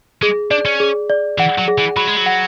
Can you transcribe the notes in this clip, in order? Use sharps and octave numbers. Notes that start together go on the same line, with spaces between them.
G#3 G#4
D4 D5
C#4
G#4
D5
E3 F#5
F#3
G#4
E3
F#3 B5
G#3
F#3
F#5